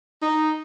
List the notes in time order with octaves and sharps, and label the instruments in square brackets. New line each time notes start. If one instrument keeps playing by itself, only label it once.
[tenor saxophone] D#4